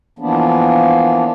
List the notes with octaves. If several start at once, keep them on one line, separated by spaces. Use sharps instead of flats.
E3 F3 A#3 B3 D4